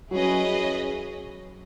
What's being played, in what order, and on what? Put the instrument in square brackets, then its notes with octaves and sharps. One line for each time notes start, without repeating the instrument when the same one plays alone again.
[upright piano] F#3 [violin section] C#4 E4 G#4 B4 D#5